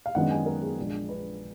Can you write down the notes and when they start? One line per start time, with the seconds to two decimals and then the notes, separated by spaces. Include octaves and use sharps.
0.06 F5
0.15 F#2 D#3 G#3 B3 D4 F#5
0.31 G#5
0.46 A#4
0.62 G#4
0.78 A#1 A#2 G#3 D4
1.09 B4